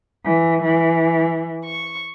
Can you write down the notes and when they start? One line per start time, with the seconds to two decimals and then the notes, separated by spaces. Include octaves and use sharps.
0.24 E3
0.62 E3
1.65 C#6